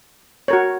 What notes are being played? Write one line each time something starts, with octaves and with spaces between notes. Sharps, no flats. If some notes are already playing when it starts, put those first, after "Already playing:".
F#4 A#4 C#5